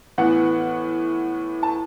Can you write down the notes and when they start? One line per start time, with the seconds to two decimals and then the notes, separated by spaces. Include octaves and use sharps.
0.18 A2 E3 B3 F#5
1.63 A5